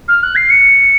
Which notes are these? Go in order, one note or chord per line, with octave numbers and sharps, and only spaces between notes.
F6
F#6
C7
C#7